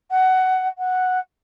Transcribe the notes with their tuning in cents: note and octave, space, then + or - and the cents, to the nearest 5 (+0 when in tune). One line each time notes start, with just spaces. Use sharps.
F#5 +15
F#5 -5